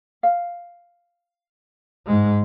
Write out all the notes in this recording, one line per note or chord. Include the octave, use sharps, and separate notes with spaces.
F5
G#2 G#3